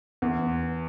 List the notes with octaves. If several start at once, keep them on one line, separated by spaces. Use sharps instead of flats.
E2